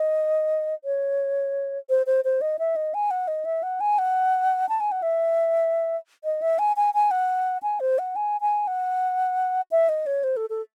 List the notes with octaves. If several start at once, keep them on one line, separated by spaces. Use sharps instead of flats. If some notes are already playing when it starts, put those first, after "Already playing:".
Already playing: D#5
C#5
C5
C5
C5
D#5
E5
D#5
G#5
F#5
D#5
E5
F#5
G#5
F#5
A5
G#5
F#5
E5
D#5
E5
G#5
G#5
G#5
F#5
G#5
C5
F#5
G#5
G#5
F#5
E5
D#5
C#5
C5
A4
A4